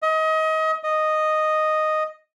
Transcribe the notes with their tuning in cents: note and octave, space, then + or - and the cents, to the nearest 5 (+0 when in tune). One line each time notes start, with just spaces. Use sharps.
D#5 +30
D#5 -5